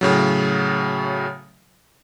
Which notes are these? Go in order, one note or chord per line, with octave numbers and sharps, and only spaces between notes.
A2 C#3 F#3